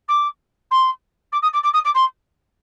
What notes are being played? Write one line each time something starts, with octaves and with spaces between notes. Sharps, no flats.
D6
C6
D6
D#6
D6
D6
D#6
D6
C6